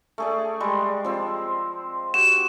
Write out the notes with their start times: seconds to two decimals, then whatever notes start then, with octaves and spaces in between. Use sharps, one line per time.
0.18 A3 G#4 D5
0.60 G3 G#3
1.04 F3 C4
2.14 F#4 G4 E7